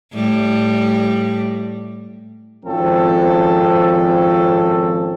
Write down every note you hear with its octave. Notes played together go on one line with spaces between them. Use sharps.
A2 G3
G#1 F3 C4 C#4 A4